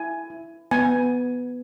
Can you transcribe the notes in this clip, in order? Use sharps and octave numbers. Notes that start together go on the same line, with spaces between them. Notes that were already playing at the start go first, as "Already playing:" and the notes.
Already playing: E4 G#5
E4
B3 G#5